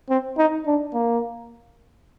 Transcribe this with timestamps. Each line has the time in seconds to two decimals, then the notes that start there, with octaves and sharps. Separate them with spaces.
0.09 C4
0.38 D#4
0.66 D4
0.94 A#3